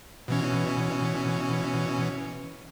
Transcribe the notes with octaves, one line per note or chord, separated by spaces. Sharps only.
B2 E3 C#4